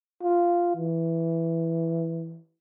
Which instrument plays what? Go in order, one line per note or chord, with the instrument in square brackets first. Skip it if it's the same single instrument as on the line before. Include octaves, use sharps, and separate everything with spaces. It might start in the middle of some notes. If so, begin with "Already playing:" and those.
[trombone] F4
E3